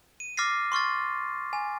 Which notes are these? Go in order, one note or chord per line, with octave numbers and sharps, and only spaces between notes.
D#7
D6 F6 A6 A#6 C7
C6 C#6 F6 A6
G#5